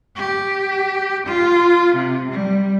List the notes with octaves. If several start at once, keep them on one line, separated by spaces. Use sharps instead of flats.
G4
F4
C3
G3